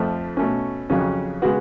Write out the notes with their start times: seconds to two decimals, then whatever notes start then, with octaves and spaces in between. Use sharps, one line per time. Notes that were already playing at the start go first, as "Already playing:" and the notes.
Already playing: F2 F3 A3
0.37 B2 A3 C#4
0.90 F2 C#3 F#3 C#4
1.42 C#3 G#3 B3 F#4